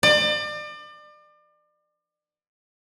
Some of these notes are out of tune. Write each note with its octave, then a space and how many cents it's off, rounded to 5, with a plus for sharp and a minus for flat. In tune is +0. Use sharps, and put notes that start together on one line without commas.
D5 +35